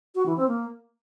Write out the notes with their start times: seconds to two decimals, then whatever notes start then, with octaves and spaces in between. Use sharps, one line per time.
0.15 F#4
0.26 E3
0.37 C4
0.48 A#3